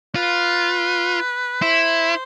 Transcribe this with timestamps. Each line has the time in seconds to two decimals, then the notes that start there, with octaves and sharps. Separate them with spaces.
0.15 F4 B4
1.62 E4 C5